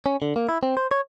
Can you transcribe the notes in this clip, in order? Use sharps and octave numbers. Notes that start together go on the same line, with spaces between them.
C#4
D3
A#3
E4
C4
C5
C#5